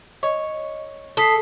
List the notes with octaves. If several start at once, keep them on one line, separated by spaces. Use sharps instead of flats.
C#5 D#5
A4 D#6 B6 C7